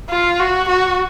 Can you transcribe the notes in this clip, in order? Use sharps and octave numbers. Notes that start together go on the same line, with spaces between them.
F4
F#4
F#4